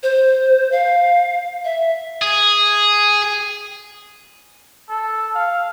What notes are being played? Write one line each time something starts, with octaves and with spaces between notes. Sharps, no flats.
C5
F5
E5
G#4
A4
F5